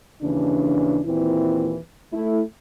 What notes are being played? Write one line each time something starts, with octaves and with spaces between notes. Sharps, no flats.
D#2 C#3 E3 D4
D#2 A#2 E3 C4 E4
A3 E4